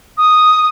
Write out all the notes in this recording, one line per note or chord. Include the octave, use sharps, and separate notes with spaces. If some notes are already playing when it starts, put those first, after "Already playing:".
D#6